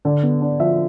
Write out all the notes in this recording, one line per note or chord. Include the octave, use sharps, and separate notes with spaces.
D3 D5
B3
D4
F3 E5